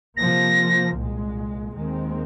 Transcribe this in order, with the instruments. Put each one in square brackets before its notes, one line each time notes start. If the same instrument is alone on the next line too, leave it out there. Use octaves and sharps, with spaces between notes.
[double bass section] C3 F3 A#3 [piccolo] A#6
[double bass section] C2 A#2 G#3
D#2 D#3 G#3 C4